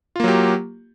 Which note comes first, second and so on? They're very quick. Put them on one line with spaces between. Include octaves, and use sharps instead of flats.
F4 A#3 F#3 G4